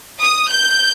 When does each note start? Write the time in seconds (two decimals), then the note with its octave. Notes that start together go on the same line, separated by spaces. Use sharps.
0.21 D#6
0.49 G6